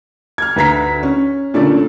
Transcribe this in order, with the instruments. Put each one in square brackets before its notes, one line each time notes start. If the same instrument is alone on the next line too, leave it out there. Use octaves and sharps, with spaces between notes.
[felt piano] F6 G#6
D2 B4 A#5 B6
C#4
A#2 D3 A3 C#4 D5